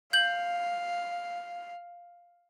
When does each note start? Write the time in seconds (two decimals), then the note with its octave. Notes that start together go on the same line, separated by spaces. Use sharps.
0.13 F5 G6 F#7